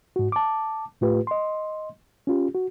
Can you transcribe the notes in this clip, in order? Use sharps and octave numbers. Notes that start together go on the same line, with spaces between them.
G#2 F#4
A5 D6
A2 A3 F4 G4 B4
D#5 C6
C#4 F4 G4
F#4